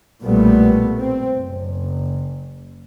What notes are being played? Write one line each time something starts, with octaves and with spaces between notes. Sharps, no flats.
B1 A#2 G3 A3 B3
C4
F#1